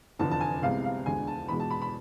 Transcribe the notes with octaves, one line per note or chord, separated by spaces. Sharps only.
F1 E2 D3 F3 A5
A5
G#5
C2 C3 G#3 B3 F5
F5
E1 D2 D3 G#3 B3 G#5
A5
E2 B2 G#3 B5
A5
B5
B5